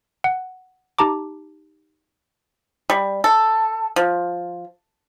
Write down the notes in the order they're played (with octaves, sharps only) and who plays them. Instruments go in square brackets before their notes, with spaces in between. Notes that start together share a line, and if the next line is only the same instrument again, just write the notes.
[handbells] F#5
D#4 G4 A5 A#5 D6
[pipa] G3
A4
F3